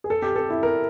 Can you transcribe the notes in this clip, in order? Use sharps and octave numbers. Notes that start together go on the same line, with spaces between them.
G#4
A4
G4
A4
E4
A#4